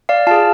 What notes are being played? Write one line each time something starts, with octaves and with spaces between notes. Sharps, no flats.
D5 F5
F4 G#4 F5 A5